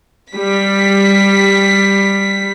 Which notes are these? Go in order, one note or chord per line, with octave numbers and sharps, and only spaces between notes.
G3 B6